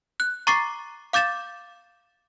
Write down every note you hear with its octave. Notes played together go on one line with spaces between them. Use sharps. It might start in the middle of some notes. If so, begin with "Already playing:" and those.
F#6
A#5 C#6 D6 A6 C7
F5 D6 G6 A6 E7